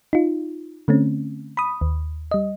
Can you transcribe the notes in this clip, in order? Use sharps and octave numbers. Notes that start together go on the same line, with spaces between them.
D#4 F4
D3 A3 C4 C#4
B5 D#6
D#2
G3 D#5